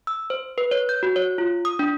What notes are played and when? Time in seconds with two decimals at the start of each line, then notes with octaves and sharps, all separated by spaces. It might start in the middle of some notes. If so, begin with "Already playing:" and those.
0.07 E6
0.30 C5
0.58 B4
0.71 C#5
0.89 G6
1.03 F#4
1.16 C#5
1.38 F4
1.65 D#6
1.79 D4